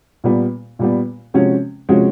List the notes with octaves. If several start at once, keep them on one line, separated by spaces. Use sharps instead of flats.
A#2 G3 B3
A#2 G3 B3
C3 F3 G#3 C#4 F#4
C3 F3 G#3 C#4 F#4